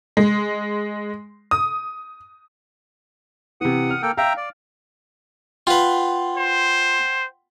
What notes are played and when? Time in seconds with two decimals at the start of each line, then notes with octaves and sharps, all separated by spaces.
0.17 G#3
1.51 D#6
3.61 C3 E3 F#5 D#6
3.90 F6
4.02 A#3 A4 G5
4.18 E5 F5 G5 A#5
4.37 D5
5.67 F4 B4 F#5 G5 C6
6.37 C5